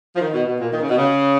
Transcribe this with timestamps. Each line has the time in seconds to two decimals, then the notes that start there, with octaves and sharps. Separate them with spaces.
0.15 F3
0.20 D#3
0.33 B2
0.47 B2
0.60 A#2
0.73 D#3
0.81 C#3
0.89 B2
0.98 C#3